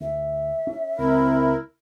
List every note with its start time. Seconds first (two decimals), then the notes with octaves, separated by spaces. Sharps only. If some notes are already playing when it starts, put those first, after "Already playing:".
0.01 D2 E5
0.67 C#4
0.98 C#2 C4 E4 A#4